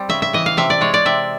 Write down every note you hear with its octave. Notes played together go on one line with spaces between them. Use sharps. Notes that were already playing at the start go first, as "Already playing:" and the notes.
Already playing: G3 C4
C#3 E5
E5
E3 D#5
F5
C3 E5
D5
G#3 C#5
D5
C3 E5